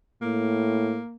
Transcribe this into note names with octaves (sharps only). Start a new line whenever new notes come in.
A2 A#3